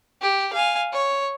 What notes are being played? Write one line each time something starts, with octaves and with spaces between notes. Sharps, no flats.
G4
F5 G#5
C#5